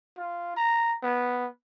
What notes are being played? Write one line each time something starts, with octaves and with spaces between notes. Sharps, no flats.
F4
A#5
B3